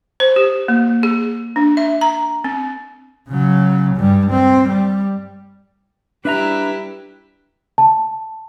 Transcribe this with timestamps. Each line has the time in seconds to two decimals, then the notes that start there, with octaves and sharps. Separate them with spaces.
0.20 C5
0.36 G4
0.68 A#3
1.03 G#4
1.56 D4
1.77 E5
2.01 A#5
2.44 C4
3.29 C#3 F#3
3.96 G2 G3
4.30 C4
4.68 G3
6.25 G3 D4 E4 G4 B4 E5 A#5
7.78 A5